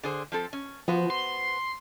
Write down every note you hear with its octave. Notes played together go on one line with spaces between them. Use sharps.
D3 G#4 C5
F3 C4 A4
C#4
F3 B3 F#4 C5
C6